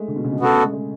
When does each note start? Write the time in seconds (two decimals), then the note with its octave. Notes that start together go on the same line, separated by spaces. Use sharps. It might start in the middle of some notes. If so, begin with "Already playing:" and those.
Already playing: G#3 A3
0.08 D3
0.16 B2
0.24 C#3
0.32 B2
0.40 C#3 B3 F#4 A4
0.51 A3
0.63 G#3
0.73 G#3